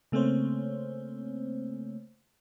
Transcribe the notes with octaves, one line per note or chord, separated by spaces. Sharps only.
C#3 A3 A#3 C4 C5 C#5